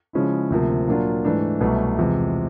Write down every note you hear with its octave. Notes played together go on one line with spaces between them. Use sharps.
C#3 F3 G#3 C#4 E4
D2 C3 F3 A#3
A#2 F#3 A#3 D4 F4
G#2 E3 A3 D4
C2 B2 F#3 A3
E2 C3 F3 G#3